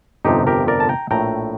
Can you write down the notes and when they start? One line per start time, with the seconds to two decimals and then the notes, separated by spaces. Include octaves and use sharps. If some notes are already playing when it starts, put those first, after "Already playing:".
0.25 G1 F2 C3 F3 D#4 G4
0.47 G4 A#4
0.68 A#4 D5
0.80 A5
0.89 G5 A#5
1.11 A#1 A2 A3 G5 A#5